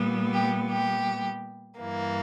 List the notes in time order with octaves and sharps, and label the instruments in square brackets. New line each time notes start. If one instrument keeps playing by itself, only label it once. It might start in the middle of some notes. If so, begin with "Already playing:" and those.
Already playing: [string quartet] A#2 G3 B3
G4
G4
G2 E3 A#3